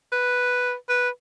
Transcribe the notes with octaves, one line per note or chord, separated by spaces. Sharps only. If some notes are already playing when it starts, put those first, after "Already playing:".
B4
B4